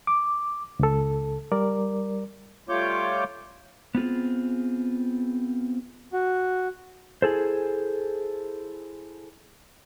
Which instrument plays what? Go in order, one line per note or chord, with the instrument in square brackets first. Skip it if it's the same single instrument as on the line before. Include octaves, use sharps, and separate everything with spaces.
[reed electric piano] D6
C#2 A4
G3 A#4 D5
[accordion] G3 A3 F4 C#5 D6 G6
[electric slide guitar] B3 C4 F4 G#4
[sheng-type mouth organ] F#4
[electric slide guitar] E4 G#4 A4 C5